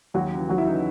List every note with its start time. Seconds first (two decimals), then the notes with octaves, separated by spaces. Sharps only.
0.14 D#2 F#3 F#4
0.32 C#3 E3
0.49 D#2 F#3 F#4
0.58 E4
0.67 C#3 E3 D#4